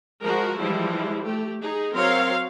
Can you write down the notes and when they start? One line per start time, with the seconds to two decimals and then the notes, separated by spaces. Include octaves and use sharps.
0.24 F3 G#3 F#4 A#4
0.60 E3 F3 G3 G#3 E4
1.23 A3 G4
1.60 D#4 G#4
1.94 F#3 C4 A#4 C#5 F5 C6